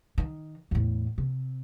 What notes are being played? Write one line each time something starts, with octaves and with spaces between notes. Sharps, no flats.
D#3
E2 A2
C3